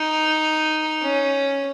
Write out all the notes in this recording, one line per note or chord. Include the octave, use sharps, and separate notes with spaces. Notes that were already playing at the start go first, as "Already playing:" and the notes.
Already playing: D#4
C#4